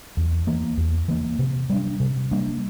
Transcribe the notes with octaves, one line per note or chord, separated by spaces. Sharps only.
E2
E3 A#3
E2
E3 A#3
C3
G3 A#3 D4
C3
G3 A#3 D4